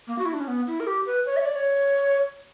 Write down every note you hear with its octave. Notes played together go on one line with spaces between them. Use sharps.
A#3
F#4
E4
D4
C#4
B3
E4
A#4
G4
B4
C#5
E5
C#5
D5
C#5